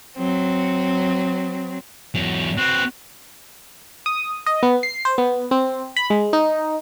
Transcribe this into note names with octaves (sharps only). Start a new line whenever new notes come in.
F#3 C4
E2 F#3
C4 F#4 B4
D#6
D#5
B3
C7
C5
B3
C4
B5
G#3
D#4